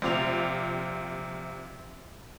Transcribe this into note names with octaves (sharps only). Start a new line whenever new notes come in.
A#1 C3 F4 D6 F7